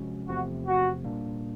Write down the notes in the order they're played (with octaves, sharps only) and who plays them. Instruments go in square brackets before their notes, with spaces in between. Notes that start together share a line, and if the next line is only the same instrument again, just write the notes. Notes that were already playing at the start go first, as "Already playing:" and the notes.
Already playing: [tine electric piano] C3 F3 G#3 C#4 F#4
[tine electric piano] E2 C3 F3 A3 [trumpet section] F#4
[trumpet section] F#4
[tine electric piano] A#2 G3 A#3 D4